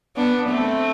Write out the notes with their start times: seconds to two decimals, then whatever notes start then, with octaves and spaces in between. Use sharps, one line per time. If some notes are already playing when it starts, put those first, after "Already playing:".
0.16 B3 D4
0.50 A3 C4